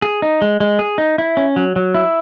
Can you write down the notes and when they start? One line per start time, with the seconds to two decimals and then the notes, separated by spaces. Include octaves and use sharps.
0.02 G#4
0.22 D#4
0.42 G#3
0.60 G#3
0.79 G#4
0.98 D#4
1.18 E4
1.37 C#4
1.56 F#3
1.76 F#3
1.95 E4